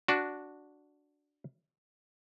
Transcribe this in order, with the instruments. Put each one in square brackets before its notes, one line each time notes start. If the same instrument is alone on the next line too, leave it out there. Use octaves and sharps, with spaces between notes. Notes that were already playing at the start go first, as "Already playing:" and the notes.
[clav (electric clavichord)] D4 F#4